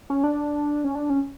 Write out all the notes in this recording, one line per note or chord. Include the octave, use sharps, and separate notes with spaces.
C#4
D4
C#4
D4
C#4